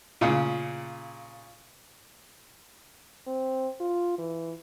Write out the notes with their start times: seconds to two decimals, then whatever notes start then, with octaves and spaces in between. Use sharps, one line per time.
0.21 A#2 C#3
3.27 C4
3.80 F4
4.18 E3